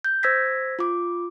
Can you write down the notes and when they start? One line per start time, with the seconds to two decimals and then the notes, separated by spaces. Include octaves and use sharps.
0.04 G6
0.23 C5 E6 G#6 A#6 B6
0.79 F4 D6